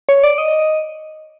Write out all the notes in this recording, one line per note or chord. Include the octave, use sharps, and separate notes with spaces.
C#5
D5
D#5